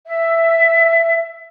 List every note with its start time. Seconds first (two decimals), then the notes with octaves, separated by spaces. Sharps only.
0.06 E5